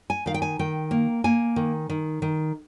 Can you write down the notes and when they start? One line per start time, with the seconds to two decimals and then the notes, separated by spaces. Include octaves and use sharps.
0.10 G#5
0.26 D#3 F5
0.34 G5
0.42 G#5
0.59 D#3 G5
0.91 A#3
1.24 A#3 G#5
1.56 D#3
1.89 D#3
2.22 D#3